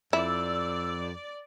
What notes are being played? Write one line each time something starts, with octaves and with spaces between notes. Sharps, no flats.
F2 E4 D5 E6